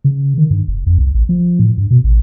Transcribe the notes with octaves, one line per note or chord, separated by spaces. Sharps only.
C#3
D#3
G2
F1
F2
C2
A1
F3
A2
G2
B2
A1